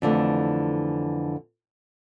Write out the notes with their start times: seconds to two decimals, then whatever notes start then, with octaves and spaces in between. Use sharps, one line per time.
0.02 F2 D3 E3 A3